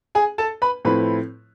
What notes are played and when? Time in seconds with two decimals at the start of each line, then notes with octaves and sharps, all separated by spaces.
0.15 G#4 G#5
0.38 A4 A5
0.62 B4 B5
0.85 A2 F3 A3 C4 E4 B4 B5